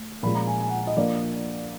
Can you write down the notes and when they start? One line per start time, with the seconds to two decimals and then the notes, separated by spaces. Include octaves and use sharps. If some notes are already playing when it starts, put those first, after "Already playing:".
Already playing: A3
0.23 A#2 F3 G#3 C#4 B5
0.35 A#5
0.47 G#5
0.60 G#5
0.69 F#5
0.87 D#5
0.97 F3 A#3 D4 D5